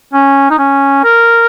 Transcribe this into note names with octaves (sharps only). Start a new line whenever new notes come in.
C#4
D#4
C#4
A#4